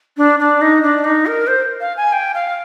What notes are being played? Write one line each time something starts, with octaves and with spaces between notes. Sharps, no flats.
D4
D4
D#4
D4
D#4
A#4
C5
F5
G#5
G5
F5